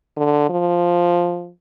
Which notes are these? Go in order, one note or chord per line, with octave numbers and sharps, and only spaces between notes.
D3
F3